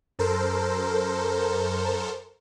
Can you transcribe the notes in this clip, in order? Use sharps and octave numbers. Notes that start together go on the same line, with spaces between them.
F#2 A4 A#4 C5